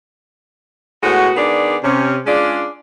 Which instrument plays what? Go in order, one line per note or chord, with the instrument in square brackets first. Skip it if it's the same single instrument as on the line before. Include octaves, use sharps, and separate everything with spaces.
[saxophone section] A2 G#3 B3 F#4
D#3 B3 D4 G#4 D5
C3 C#4
G#3 C#4 D4 F4 G#4 D5